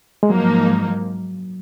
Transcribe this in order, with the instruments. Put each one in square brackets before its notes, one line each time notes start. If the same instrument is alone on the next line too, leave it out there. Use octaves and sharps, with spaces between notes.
[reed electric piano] G#3
[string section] G#2 F3 A#3 D#4 [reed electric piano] F#3